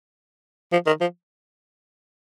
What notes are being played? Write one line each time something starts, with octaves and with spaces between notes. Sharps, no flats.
F3
D#3
F3